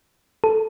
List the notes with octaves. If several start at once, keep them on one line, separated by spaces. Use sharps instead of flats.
A4